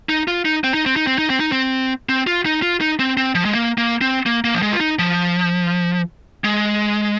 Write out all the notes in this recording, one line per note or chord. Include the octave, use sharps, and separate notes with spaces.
D#4
F4
D#4
C4
D#4
C4
D#4
C4
D#4
C4
D#4
C4
C4
F4
D#4
F4
D#4
C4
C4
F3
G#3
A#3
A#3
C4
A#3
A#3
F3
G#3
F4
D#4
F3
G#3